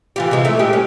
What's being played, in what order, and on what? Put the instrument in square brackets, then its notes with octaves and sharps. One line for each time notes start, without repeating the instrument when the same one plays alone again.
[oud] E3 F4 G4
C3 G#3
A3 E4
A#2 G#3 G4
C#4